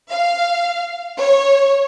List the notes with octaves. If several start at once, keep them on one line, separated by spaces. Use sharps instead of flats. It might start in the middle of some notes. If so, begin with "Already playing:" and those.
F5
C#5